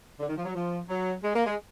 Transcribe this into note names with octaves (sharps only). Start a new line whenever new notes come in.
D3
D#3
F3
F#3
F3
F#3
G#3
A#3
G#3